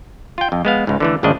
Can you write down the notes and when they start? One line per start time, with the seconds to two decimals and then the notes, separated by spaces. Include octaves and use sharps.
0.38 F4 G5
0.52 F2
0.65 G#3 B3 F5
0.87 C#2 G#2
1.00 D3 E3 A3
1.23 G#1 D2 C#3 F3 D4 D#5